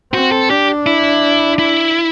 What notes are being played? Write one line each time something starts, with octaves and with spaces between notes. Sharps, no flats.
C4 F#4
A4
D4 G4
E4
E4